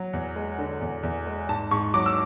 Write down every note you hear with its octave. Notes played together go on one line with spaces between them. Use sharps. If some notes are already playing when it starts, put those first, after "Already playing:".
Already playing: F#3
E2
G#3
D3
E2
E2
G#3
G#2 A5
G#2 C#6
F#3 D6
E6